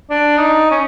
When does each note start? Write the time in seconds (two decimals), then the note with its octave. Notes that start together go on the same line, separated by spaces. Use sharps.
0.11 D4
0.38 D#4
0.71 C#4